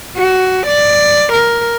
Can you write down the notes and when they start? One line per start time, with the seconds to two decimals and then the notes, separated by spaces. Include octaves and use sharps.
0.17 F#4
0.67 D5
1.33 A#4